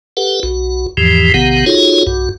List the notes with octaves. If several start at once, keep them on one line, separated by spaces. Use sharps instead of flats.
G4 A4 B4 F#5
B1 F#4
E2 G#2 E3 F3 G4
A#1 C3 D#3 B3 G4 F#5
D#4 F4 F#4 G#4 A4 C#5
B1 G2 F#4